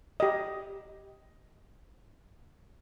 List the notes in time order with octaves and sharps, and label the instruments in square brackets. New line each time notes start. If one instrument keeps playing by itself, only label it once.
[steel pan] G4 D#5